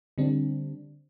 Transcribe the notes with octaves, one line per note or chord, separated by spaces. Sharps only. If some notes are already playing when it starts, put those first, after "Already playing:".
D3 G3 C4 D4